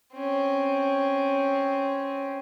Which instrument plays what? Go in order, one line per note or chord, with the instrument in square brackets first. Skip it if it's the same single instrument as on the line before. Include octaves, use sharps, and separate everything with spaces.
[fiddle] C4 C#4